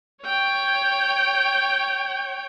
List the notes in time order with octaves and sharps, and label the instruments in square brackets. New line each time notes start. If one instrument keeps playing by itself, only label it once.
[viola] C#5 G5